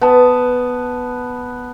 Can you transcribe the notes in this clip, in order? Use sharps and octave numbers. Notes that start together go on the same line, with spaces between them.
B3 A5